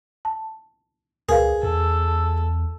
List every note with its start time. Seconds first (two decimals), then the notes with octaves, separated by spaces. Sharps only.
0.25 A5
1.29 C#2 G#4 A#4 B4 F5
1.63 E2 A4